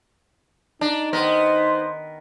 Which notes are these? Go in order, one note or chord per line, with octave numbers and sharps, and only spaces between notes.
D4 D#4 A#5
D#3 B3 A#4 C5